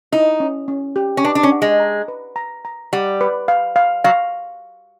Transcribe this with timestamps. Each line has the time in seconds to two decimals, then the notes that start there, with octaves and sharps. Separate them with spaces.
0.12 D#4 E4
0.40 C#4
0.68 C#4
0.96 G4
1.17 C#4
1.24 D4 B4
1.35 D4
1.43 C#4
1.52 F#5
1.62 G#3
1.80 A#5
2.08 B4
2.36 A#5
2.65 A#5
2.93 G3 F#5
3.21 B4
3.48 F5
3.76 F5
4.04 F#3 F5